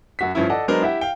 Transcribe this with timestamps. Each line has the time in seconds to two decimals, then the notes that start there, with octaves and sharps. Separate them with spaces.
0.19 F#2 F#4 B6
0.35 G2 F3 C#4 E4
0.50 A4 D5 D#5 F#5
0.68 F#3 G#3 B3 D4 A#4 C5
0.82 E4 G4 E5 F#5
1.01 F5 G5